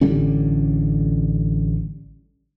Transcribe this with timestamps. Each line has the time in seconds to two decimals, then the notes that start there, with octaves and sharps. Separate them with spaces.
0.01 A1 D3 G3 C#4